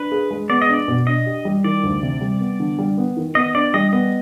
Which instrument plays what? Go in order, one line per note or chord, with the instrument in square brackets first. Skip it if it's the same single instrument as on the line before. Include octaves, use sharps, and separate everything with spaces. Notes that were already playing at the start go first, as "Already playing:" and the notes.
Already playing: [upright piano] D4 [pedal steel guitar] B4
[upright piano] G#4
G#3
[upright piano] B3 [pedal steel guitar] D5
[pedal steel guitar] D#5
[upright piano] D4 [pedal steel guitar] D5
[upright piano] B2
[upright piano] D4 [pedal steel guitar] D#5
[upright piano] G4
G3
[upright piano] D#3 [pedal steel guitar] D5
[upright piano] D2
C3
G3
B3
D3
G3
B3
D#3
[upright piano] B3 [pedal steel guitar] D#5
[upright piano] D4 [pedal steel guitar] D5
[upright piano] G3 [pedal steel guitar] D#5
[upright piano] B3 [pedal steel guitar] D#5